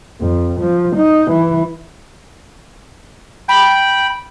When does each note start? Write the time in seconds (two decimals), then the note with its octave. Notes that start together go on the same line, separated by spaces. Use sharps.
0.21 F2
0.62 F3
0.97 D#4
1.32 E3
3.48 G5 B5